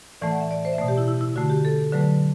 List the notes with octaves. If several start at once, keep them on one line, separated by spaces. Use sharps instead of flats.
A2 E3 A3 D5
F#5
E5
D5
C5
E5
B2 A3 D5
G4
E4
E4
E4
D3 A3 F#4
G4
A4
D3 F#3 A3 B4